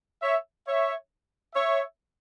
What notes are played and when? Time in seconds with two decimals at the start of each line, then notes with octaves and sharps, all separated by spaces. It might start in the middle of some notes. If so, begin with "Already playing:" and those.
0.22 C#5 E5
0.66 C#5 E5
1.54 C#5 E5